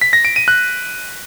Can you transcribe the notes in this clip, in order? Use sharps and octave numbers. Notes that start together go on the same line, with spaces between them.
B6
A#6
D7
D#7
F#6